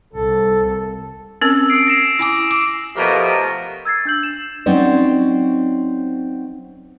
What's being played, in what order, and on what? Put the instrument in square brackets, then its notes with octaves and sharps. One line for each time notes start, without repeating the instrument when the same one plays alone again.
[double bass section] C2 [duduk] A4
[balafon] C4 C#4 A#4 [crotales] E6
[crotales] D#6 C7 D7
A#6 C7 E7
[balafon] E4 G#5 D6
D6
[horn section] B2 F3 A3 G4 A#4
[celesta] E6 G#6 A6 C7
D4 G6 F#7
E7
[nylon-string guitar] F#3 C4 C#4 D#4 D5